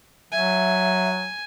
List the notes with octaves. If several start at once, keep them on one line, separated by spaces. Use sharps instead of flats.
F#3 E5 G#5